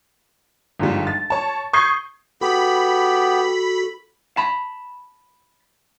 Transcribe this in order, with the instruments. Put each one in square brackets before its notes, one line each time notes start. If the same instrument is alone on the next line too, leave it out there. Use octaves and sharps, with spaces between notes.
[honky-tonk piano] G1 G#2 F3 G3
A6
C#5 A5
C#6 D#6 G6 G#6 C7
[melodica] B3 G4 [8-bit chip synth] F#4 A4 [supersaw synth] B5
[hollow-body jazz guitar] A5 B5